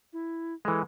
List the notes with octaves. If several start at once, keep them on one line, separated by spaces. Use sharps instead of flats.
E4
E3 G#3 A4